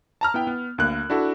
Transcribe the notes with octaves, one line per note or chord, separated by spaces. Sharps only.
A5 A#5 F6
B3 E4 G5
B3
D2 A#3 F#6
D4 E4 F#4 A4